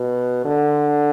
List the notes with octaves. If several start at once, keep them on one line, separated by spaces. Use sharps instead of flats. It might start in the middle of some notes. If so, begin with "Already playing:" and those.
Already playing: B2
D3